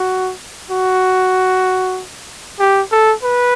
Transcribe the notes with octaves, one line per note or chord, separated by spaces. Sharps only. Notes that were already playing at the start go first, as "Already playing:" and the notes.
Already playing: F#4
F#4
G4
A4
B4